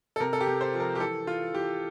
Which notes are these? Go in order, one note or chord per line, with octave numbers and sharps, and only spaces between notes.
A4
C3 A#4
A4
G4
C3
C5
F3
A#4
G4
E3 A4
E3 F4
E3 G4